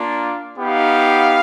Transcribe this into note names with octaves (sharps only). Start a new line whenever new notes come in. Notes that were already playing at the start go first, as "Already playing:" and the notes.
Already playing: A#3 D4 F4
B3 D#4 G4 F5